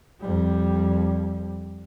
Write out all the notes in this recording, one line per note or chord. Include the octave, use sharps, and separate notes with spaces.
F2 G3